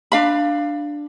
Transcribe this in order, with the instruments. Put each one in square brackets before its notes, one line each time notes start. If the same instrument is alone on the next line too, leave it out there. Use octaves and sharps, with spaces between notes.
[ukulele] D4 F5 B5